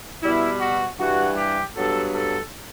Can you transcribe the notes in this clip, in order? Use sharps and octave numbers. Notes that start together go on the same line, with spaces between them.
B2 G3 B3 E4
F#4
G2 E3 G3 F#4
G4
G2 F#3 B3 A4
A4